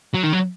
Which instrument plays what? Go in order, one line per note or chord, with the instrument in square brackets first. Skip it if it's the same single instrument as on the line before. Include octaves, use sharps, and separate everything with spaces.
[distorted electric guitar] F#3
D#3
F#3